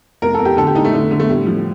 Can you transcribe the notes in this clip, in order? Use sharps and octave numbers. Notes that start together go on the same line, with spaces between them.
F1 A#4
A4
F1
G4
D3 A4
G4
F1 D#4
A3
D3
D3
A3
A2 G3
F3